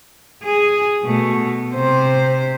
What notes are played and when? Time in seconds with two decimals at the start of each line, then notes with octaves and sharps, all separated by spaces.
0.43 G#4
1.04 B2 A3
1.74 C3 C5